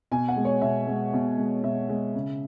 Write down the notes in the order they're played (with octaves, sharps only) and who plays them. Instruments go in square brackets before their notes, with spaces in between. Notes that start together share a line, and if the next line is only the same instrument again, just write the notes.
[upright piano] B2 G#5
F#5
G#3
C#5
B2 E5
G#3
B2
G#3
B2 E5
G#3
C#3